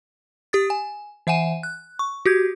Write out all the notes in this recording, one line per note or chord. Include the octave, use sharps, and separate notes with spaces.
G4 D#6 A6
G#5
E3 E5 F#5 G#5 D#7
F#6
C#6
F#4 G4 G6 G#6